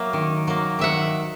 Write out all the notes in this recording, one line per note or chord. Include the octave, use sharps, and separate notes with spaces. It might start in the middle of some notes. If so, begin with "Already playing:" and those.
Already playing: F#3 A#3 E5
D#3
F#3 A#3
D#3 E5 F#5